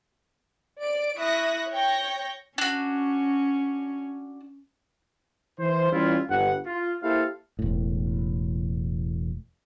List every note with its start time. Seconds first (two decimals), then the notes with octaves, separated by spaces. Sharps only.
0.80 D5 D7
1.16 E4 E5 C#6 D#6 F#6 A#6
1.70 C#5 G5 C#6 G6 A#6
2.58 C#4 D4 F#4
5.58 E3 C5
5.91 E3 G3 C#4 E4 F4
6.29 G1 F#5
6.66 F4
7.02 A#3 E4 G4 A4 C5 F5
7.59 E1 A2